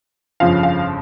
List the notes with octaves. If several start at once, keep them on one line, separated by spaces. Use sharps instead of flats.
G1 F2 C#3 F3 F5
F5